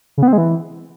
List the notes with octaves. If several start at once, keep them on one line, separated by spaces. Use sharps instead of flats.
C#3
B3
C4
G#3
E3